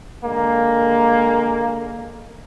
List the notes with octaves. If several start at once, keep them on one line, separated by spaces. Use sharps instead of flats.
D3 G#3 A#3